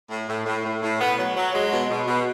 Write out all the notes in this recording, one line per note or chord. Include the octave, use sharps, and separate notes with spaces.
A2
A2
A2
A2
A2
B2 B3
F#3
F#3
F#3 G#3
B2
B2
B2